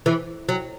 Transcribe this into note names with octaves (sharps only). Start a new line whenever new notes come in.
E3
F#3